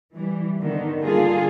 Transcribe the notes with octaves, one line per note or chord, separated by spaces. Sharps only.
E3 G3
D3 D#3 B3
D3 G3 A#3 F4 G#4 A4